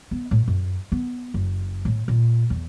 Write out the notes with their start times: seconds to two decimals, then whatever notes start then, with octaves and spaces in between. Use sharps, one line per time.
0.11 B3
0.31 A2
0.48 F#2
0.92 B3
1.34 F#1
1.85 A2
2.08 A#2
2.50 E2